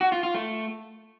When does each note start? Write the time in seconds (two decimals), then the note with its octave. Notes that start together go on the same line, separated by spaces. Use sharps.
0.01 F#4
0.12 F4
0.23 F4
0.34 A3